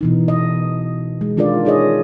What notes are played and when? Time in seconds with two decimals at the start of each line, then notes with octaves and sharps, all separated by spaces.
0.01 B2 E3 D#4
0.28 D#5
1.21 G#3
1.37 D#3 D4 F4 A#4 D5
1.65 D#4 G#4 C#5 D#5